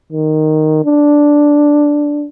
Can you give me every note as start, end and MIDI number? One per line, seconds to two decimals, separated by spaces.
0.13 0.81 51
0.85 2.27 62